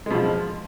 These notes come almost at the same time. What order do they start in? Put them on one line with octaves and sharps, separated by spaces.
G#3 B2 F3